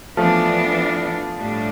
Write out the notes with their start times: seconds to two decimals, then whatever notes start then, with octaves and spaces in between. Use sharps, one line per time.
0.17 E3 F3 A3 B3 D4
1.38 A2 G3 D4